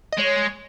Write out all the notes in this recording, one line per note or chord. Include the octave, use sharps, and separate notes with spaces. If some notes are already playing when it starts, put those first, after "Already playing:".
D#5
G#3 C#5